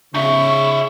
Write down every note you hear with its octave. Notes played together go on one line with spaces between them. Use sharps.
C#3 D#4 E5 C#6